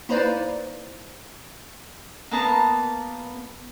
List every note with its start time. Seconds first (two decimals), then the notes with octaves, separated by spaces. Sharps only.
0.09 A#3 D#4 E4 B4 C5 D5
2.31 A#3 B3 A5 A#5